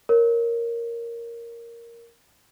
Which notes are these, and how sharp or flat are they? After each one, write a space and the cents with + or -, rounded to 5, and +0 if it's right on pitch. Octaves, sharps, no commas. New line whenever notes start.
A#4 +0 C#5 +0